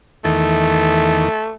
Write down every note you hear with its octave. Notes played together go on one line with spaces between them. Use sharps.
E2 D#3 A3